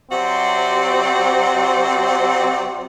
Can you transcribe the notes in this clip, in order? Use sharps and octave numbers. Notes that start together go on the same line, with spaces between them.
C3 F#3 C4 F#4 D5 C6